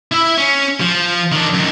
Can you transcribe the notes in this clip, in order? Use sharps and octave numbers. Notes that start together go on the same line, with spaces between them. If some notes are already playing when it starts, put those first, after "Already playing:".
E4 E5
C#4
F3
D#3 D4
F#2 D#3